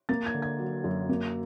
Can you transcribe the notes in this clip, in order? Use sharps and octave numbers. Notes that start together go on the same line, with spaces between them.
A#3 A6
G#6
D3
G#6
F#3
F#2
A#3